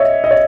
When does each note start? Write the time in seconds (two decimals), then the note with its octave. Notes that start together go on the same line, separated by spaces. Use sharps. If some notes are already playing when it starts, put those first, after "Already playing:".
Already playing: C#5 D#5 E5
0.24 D#5
0.31 C#5